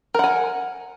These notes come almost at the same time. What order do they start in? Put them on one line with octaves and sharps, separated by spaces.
A#4 F#5 G#5